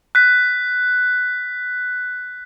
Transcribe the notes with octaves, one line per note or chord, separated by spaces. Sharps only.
F#6 B6